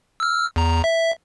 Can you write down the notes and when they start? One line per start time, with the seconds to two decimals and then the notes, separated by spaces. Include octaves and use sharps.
0.20 E6 F6
0.56 E2 A#5
0.84 E5